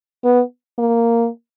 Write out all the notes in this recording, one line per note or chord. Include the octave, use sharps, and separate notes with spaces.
B3
A#3